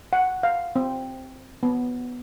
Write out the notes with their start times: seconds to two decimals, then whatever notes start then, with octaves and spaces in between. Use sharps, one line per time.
0.13 F#5
0.43 F5
0.76 C4
1.63 B3